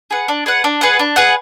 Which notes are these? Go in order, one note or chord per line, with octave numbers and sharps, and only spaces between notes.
G#4 B4 F#5
D4
G#4 B4 F#5
D4
G#4 B4 F#5
D4
G#4 B4 F#5